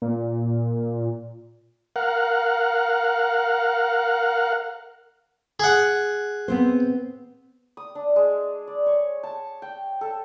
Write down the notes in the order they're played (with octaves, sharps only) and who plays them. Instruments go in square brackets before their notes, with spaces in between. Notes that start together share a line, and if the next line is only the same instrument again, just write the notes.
[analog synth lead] A#2
[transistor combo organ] A#4 F5 F#5
[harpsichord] G#4 F#5
[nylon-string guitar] B3 C4 C5
[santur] D#6
D4
G#3
D5
C#5
A5
G5
A4